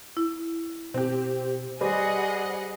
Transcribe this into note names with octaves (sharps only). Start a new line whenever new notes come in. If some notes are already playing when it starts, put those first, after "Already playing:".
E4
B2 C4 G4
G3 G#4 B4 C5 D5 D#5 F#5